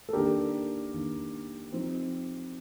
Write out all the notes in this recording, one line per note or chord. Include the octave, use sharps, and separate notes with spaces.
A4
D#3 A#3 D4 G4 A#4
D#3 A#3 D4
F3 C4 D#4